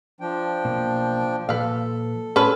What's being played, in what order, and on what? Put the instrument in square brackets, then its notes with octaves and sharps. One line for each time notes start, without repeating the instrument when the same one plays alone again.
[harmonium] F3 D4 G5
[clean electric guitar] B1 B2 A#3
[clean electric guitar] A#2 F3 [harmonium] A4 [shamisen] B4 F5
[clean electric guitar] A2 [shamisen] C#4 A4 B4